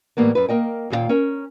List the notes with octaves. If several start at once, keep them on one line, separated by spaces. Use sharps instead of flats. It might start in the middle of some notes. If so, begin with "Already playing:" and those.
A2 E3 F3 G3 A#3 B3
F#2 B4
A#3 A#4 D#5 G5
D#2 A#2 G4 F5 G5
C#4 A#4